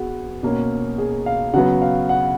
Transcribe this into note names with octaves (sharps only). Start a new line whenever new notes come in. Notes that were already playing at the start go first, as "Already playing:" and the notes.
Already playing: B3 F#4 G#4
B2 A#3 C#4
G#4
F5
C#3 F#3 B3 F#5
F5
F#5